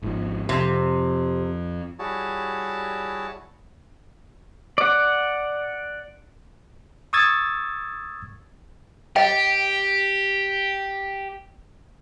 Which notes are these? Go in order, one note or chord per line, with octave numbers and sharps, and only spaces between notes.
G#1 G#2 F3
F2 C3 F3
G3 E4 F#4 G#4 C#5 A5
D5 F#5
C#6 D#6 E6 G#6 A6
G4 D#5 G5